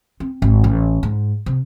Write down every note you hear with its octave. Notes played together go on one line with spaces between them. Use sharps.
C4
G#1
A1
G#2
C3